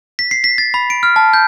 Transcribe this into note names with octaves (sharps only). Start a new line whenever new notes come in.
B6
C7
B6
A6
B5
D7
F6
A5
G6